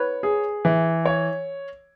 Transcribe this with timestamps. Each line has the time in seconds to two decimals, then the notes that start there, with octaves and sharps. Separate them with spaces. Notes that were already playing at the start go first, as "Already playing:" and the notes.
Already playing: B4 C#5
0.23 G#4
0.65 E3
1.06 C#5